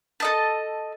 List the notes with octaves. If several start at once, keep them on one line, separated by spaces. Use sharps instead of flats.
A4 D#5 A5